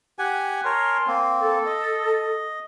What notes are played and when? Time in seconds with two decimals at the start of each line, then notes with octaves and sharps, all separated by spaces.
0.19 G4 F#5 G#5
0.65 A#4 C#5 G#5 A5 C6
1.07 A#3 C4
1.42 A4
1.66 D#5